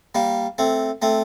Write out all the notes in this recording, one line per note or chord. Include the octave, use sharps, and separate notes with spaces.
G3 A#3
A3 C4
A3 C4